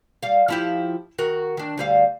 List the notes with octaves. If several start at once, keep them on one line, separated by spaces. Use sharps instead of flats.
G3 F5
F3 E4 G4
D#3 F#4 A#4
D#3 D4
D2 G3 F5